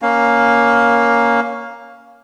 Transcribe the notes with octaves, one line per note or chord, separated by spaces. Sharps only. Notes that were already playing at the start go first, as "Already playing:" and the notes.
A#3 C#4 F5